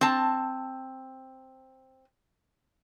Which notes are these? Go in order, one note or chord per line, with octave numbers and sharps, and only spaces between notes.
C4 A5